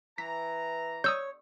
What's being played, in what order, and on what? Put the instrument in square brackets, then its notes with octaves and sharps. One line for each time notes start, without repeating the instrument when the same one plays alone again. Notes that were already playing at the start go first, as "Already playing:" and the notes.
[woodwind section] E3 A#5 [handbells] B6
[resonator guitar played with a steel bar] C#5 [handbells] D#6 E6 G6